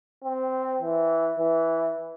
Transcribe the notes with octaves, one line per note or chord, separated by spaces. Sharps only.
C4
E3
E3